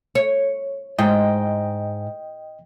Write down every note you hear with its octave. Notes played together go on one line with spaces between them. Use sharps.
C#5
G#2 D#5 G5